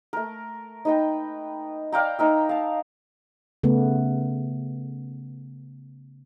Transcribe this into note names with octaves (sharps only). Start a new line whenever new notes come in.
A3 A#4
D#4 B4 G5
D5 F5 G5 A#5
D#4 A#4 E5
F5 A5
C#3 A3 B3